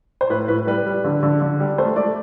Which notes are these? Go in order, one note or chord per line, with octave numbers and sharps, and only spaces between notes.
C5
A2 B4
A2 B4
G3 B4
G3
D3
D3
D3
G3
A3 C5
A3 D5